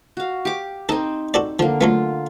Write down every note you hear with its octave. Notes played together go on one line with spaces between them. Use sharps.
F#4 F5
G4 D6
C4 D#4 A4
F#4 A4 D5
D3 F3 A#3
F#3 A3 B3 F4